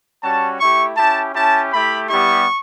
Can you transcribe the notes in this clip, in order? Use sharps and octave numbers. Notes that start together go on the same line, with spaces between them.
G3 C#4 F#4 A5
A3 E4 G4 C#6
C#4 E4 G4 A5
C#4 E4 G4 A5
A3 E4 G4 B5
G3 B3 E4 G4 C#6